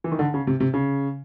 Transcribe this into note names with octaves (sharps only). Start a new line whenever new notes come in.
E3
D#3
D3
C#3
C3
C3
C#3